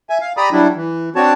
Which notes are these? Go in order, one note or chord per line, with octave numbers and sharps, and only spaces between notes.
E5 G#5
F5
G4 D5 A#5 B5 D#6
F#3 G3 D4 E4
E3
C4 D4 F#4 C#5 A5